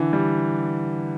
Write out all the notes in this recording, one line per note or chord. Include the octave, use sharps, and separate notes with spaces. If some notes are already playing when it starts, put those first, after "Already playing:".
Already playing: D3 E3
G3